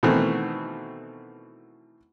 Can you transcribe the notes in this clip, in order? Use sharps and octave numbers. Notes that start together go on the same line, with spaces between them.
B2 D#3 E3 A3 C4